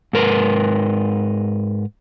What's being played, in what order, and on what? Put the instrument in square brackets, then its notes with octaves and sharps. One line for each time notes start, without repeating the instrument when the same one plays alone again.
[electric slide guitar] G#2 A#4 B4